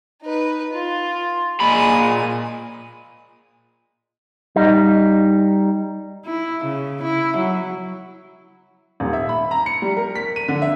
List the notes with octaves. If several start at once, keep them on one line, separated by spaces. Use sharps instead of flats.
D#4 B4
F4
A#2 G#3 B5 D#6
G3 D#4
E4
C#3
E4
F#3
D#1
E5
B5
A#5
C#7
G3
A#4
B6
D#7
D3
E5